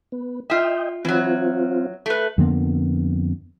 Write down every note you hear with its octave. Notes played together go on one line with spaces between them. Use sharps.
B3
F4 D#5 E5 G5
E3 F#3 C4 F4
A3 B4
F2 D3 A#3 B3